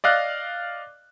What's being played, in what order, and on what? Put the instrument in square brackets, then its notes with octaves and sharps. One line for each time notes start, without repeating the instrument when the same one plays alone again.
[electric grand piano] D5 D#5 F5 F#6